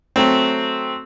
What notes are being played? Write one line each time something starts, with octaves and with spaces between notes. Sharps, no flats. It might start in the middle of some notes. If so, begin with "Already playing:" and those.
F#3 A3 C4